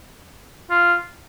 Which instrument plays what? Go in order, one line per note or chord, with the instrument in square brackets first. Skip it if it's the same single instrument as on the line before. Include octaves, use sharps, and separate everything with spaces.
[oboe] F4